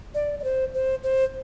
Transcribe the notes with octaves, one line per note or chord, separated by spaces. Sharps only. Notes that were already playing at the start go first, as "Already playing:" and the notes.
D5
D5
C5
C5
C5